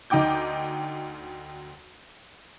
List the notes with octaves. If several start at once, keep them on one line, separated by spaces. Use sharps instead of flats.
D2 D#4 G5 D6 G6